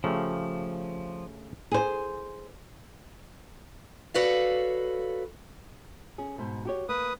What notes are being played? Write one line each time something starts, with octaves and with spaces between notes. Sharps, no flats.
C#3 F3 A3 G4
G#4 C5
F#4 A4 B4 C#5 D5 F5
C#4 G#4
G#2 B2 C5
F#4 G4 C#5
A#3 B4 D#6